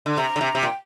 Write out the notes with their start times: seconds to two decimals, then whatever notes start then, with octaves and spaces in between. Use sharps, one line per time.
0.06 D3
0.17 C3 A#5
0.36 D3
0.41 C3
0.55 C3
0.63 A#2 G5